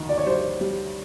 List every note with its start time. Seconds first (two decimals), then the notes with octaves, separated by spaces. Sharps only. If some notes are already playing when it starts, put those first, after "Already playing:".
Already playing: D2 D#3
0.09 D5
0.18 C#5
0.26 G3 C5
0.61 G3